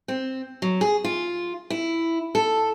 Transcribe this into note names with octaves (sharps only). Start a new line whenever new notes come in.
C4
F#3
G#4
F4
E4
A4